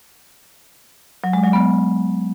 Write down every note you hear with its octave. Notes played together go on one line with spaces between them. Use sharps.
F#3
G#3
F#3
B3